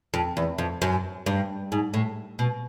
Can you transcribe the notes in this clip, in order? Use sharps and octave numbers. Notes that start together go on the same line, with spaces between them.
F2
E2
F2
F#2
G2
G#2
A2
B2